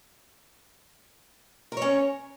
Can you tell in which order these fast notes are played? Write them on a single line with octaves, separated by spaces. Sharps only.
A#4 C#5 C#4